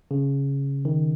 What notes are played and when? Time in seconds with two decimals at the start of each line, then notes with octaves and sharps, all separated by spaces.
0.11 C#3
0.85 D#3